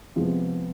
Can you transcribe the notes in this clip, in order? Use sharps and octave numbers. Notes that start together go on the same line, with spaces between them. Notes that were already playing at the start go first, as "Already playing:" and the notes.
C3 F3 G#3 B3